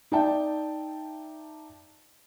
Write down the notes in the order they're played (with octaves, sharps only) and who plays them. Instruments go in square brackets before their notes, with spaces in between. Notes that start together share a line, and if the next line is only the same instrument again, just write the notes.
[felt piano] D#4 D5 E5 G5 A5